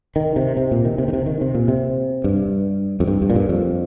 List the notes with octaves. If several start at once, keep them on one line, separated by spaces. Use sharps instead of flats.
D#3
C3
C3
A#2
D#3
C3
D#3
C3
D#3
C3
A#2
C3
G2
F2
G2
G2
A#2
G2
F2